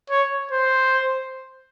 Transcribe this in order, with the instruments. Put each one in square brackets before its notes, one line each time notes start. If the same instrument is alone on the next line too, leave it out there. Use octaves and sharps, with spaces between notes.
[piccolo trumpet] C#5
C5